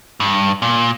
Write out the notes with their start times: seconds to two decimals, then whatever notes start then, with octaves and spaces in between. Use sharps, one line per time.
0.20 G2
0.62 A#2